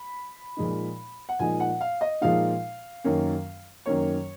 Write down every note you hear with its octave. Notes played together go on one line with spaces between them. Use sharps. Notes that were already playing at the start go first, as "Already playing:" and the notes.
Already playing: B5
A#2 F3 G#3 D#4
F#5
A#2 F3 G#3 D#4 G#5
F#5
F5
D#5
A#2 F3 G#3 D#4 F5
F#2 D#3 A#3 C#4
F#2 D#3 A#3 C#4 C#5